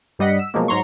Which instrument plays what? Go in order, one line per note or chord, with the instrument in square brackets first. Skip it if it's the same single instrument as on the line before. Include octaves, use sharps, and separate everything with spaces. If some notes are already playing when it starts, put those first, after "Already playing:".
[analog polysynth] G2 G3 D#5 F#5 B6
E6
B2 F3 F#3 G#3 A#3
G#2 F#3 A#5 C6 C#6